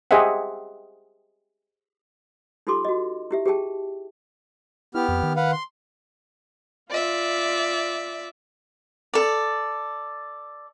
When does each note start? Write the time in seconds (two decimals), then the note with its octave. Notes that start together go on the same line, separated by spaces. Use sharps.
0.11 G4 G#4 C5 D#5 E5 F#5
2.67 D#4 F4 G4 A4 C6 D6
2.85 F#4 D#5
3.31 E4 G4 E5
3.46 G4 G#4 G5 A5
4.95 B3 E4 G4 F6
5.08 F2
5.23 D#3
5.36 B4 F5 F#5
5.52 C6
6.89 F4 D5 E5
9.14 A4 D5